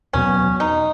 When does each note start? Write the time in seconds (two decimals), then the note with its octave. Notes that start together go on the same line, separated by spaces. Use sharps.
0.13 E2 B2 F#3 B3 C#4
0.60 D#4